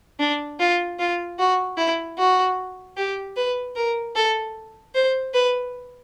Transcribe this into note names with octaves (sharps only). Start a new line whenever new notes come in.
D4
F4
F4
F#4
E4
F#4
G4
B4
A#4
A4
C5
B4